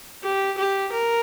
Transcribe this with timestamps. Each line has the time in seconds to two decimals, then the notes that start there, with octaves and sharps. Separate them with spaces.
0.23 G4
0.57 G4
0.92 A#4